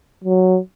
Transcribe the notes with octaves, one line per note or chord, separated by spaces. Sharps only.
F#3